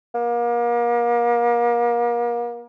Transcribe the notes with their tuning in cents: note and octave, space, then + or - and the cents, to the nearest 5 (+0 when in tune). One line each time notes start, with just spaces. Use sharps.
A#3 +35